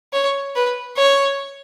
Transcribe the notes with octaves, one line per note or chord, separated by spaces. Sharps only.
C#5
B4
C#5